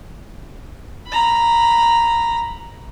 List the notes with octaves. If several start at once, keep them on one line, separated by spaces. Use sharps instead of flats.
A#5 B5